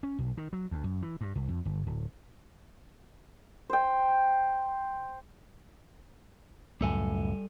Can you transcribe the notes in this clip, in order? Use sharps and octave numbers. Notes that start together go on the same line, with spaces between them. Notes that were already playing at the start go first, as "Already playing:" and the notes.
C#4
B1
D#3
F#3
D2
F#2
E3
G2
C2
F2
G1
D1
C5 G5
C#2 F#2 A2 G3 A4 G#5